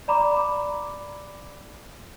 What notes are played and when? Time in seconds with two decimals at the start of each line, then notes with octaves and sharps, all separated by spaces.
0.08 D5 A#5 B5 D6